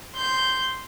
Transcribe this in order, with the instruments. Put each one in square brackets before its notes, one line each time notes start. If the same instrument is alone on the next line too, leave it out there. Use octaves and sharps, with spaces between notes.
[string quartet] C6 G6